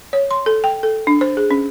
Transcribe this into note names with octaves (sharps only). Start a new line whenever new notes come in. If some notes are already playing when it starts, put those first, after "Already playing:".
C#5
C6
A4
G5
A4
D4
C5
G#4
C#4